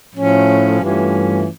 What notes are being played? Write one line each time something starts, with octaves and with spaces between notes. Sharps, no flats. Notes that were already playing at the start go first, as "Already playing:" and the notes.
A2 F3 A3 C#4
G2 E3 A3 C#4 F4